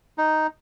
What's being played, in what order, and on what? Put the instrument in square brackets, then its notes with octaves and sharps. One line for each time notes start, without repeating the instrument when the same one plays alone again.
[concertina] D#4